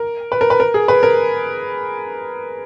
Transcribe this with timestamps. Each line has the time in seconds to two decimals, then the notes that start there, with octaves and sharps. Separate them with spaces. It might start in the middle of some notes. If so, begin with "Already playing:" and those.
Already playing: A#4
0.32 B4
0.41 A#4
0.50 B4
0.60 A#4
0.74 G#4
0.88 B4
1.03 A#4